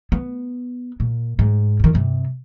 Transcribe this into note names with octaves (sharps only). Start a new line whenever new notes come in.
B3
A#2
G#2
F2 D#3
G2 C3